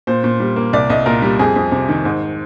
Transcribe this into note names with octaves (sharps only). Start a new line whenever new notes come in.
A#2 C5
A#2
G3
A#3
C2 D5
C2 D#5
A#2 A#4
G3
F2 G#4
F2
C3
D#3
G#2